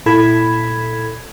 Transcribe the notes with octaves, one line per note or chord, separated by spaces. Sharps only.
A#2 E4 A4 B5 G#6 B6